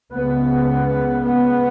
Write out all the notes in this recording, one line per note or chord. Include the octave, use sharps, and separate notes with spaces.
C#2 C#3 B3
B3